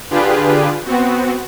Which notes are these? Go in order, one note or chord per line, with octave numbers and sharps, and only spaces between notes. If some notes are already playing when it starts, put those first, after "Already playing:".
D3 D4 F4 G4 G#4 B4
B3 C4 F#4